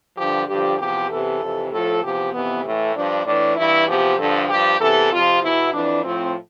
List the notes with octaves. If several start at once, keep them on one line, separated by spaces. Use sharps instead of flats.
G2 D3 F3 G4
G2 D3 F3 G4
E2 C3 F3 G4
E2 C3 E3 A4
F2 C3 E3
A2 F3 A4
E2 C3 F3 G4
F2 C3 E3 B3
A2 E3 A3
G2 F3 D4
A2 E3 D4
G2 E3 E4
E2 C3 F3 G4
G2 D3 F3 A4
G2 F3 G4
E2 C3 E3 A4
F2 C3 F3 F4
E2 B2 E4
F2 E3 D4
A2 F3 C4